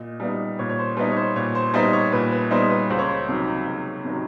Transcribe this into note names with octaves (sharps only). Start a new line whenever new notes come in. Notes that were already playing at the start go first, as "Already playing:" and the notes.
Already playing: A#2 D#5
G3 B3 D#4
A#2 C#5
C#5
C5
G3 B3 D#4 B4
C#5
C5
A#2 C#5
C5
G3 B3 D#4 C5
C#5
A#2 B4
B4
G3 B3 D#4 C5
B4
C#2 C5
C#5
C5
C3 D#3 F#3
C#2
C3 D#3 F#3